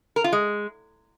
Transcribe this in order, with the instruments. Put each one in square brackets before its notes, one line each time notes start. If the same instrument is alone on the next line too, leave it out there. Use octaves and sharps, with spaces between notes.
[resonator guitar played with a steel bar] A#4
F4
G#3